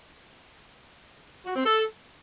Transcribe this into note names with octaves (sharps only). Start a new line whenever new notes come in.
F#4
C4
A4